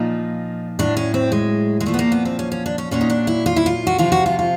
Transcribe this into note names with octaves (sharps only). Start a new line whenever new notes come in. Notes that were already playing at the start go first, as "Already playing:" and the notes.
Already playing: A#2 F3 D#4
A2 F#3 D4
C#4
C4
G#3
G#3
A#2 F3 A3
B3
A#3
B3
C4
C#4
C#4
D4
C#4
A#2 F#3 C#4
D#4
D4
E4
F4
E4
F4
F#4
C3 F3 F4
F#4
F4
F4